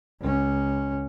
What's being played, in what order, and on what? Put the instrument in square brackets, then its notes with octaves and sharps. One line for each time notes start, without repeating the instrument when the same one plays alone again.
[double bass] C#2 C#4